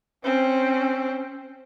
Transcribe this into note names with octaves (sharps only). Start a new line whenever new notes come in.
C4 C#4